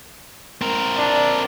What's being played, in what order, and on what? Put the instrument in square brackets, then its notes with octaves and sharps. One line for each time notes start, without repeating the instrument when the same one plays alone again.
[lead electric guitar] C4 A#4
[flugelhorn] D4